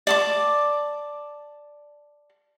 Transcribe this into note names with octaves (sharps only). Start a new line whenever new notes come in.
D5 A5 D6